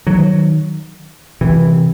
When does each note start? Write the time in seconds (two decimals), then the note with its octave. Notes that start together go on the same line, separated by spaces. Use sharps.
0.06 D#3 F#3
1.41 C3 E3